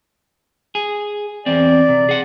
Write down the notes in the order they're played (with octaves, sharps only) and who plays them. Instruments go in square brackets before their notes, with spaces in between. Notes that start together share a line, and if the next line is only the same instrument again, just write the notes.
[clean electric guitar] G#4
[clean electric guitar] E2 C4 [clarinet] D5
[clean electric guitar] C3
G#4 F#5